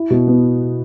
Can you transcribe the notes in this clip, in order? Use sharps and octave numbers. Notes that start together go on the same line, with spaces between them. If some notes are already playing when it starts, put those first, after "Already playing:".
Already playing: E4
B2
B3